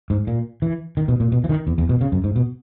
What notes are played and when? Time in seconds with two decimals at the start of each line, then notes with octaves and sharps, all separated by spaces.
0.10 G#2
0.27 A#2
0.62 E3
0.97 D#3
1.08 B2
1.20 A#2
1.32 B2
1.44 E3
1.49 D#3
1.67 E2
1.78 E2
1.89 B2
2.01 C#3
2.12 F#2
2.24 G#2
2.36 B2